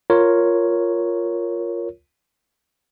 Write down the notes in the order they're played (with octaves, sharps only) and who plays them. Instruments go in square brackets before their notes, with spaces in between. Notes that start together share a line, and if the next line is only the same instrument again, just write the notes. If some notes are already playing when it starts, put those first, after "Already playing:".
[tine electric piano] F4 A#4 C#5